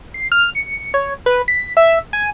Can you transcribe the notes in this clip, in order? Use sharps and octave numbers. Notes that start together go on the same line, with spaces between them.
C7
F6
C#7
C#5
B4
B6
E5
G#5